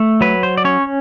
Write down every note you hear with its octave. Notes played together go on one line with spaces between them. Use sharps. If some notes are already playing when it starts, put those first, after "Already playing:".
Already playing: A3
F#3 B4
C5
D5
C#4 C#5